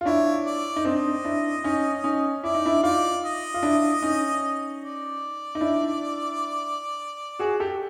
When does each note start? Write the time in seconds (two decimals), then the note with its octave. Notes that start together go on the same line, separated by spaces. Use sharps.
0.01 F4
0.05 D4 E4 C#5
0.46 D5
0.76 D#4
0.85 C4 D4 D#5
1.24 D4 E4
1.64 C#4 D#4
2.04 C#4 D#4
2.44 E4 D5
2.54 D#4
2.66 D4 E4
2.83 D#4 F4 D5
3.24 D#5
3.54 F4
3.63 D4 E4
4.02 C#4 D#4
4.82 D5
5.55 D#4
5.61 D4 E4
7.39 F#4 G#4
7.60 G4 A4